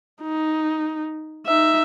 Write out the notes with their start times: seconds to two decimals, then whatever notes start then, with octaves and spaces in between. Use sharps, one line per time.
0.22 D#4
1.46 D#4 E5